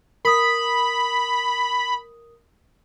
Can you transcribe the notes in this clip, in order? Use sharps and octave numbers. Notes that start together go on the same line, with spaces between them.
A#4 B5 D#6